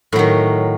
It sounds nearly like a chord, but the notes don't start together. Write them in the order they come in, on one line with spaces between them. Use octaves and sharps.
A2 F#3 D#3